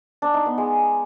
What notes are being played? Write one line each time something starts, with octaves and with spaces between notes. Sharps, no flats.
D4
D#4
B3
G#3